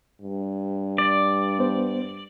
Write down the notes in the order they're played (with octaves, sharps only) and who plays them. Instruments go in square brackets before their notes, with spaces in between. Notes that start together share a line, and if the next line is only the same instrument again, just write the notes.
[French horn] G2
[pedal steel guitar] D5
[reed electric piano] B3 C5